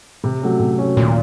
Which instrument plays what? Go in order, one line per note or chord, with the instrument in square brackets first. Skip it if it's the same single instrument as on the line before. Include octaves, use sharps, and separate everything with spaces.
[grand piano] C3
F#3 A3 C#4
C3
F#3 A3 C#4
[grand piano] D#2 [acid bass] A#2